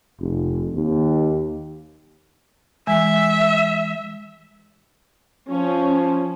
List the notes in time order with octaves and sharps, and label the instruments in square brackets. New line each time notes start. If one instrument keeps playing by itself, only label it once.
[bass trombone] F1
D#2
[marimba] E3 G#3 G#5 [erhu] E5
[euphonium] F3 [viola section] C#4